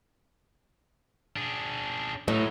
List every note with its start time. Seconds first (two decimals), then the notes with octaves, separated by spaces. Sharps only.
1.36 D4 G#4
2.28 A2 F#3 D#4